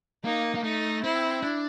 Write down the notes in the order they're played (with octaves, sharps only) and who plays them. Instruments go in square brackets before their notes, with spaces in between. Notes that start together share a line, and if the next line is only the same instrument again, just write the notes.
[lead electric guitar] A#3 [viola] D#4
[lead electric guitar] A#3
[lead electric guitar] A3 [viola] D#4
[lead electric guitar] C4 [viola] E4
[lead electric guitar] D4